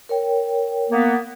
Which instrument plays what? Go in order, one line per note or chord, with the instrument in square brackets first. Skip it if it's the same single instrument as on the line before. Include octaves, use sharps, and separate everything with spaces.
[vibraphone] A#4 C#5 G5
[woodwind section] A#3 B3